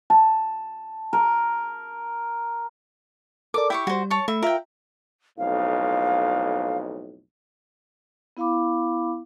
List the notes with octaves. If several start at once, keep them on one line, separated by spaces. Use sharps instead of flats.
A5
A#4
A4 A#4 D5 D6
E4 G4 G5 C#6
G3 F#4 C5
C#5 A5 C#6
A3 E5 B5
F4 A#4 E5 G5
B1 F2 A2 F5
B3 E4 F5 B5 D6